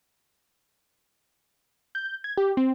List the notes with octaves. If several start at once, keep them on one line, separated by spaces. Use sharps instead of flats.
G6
G#6
G4
C4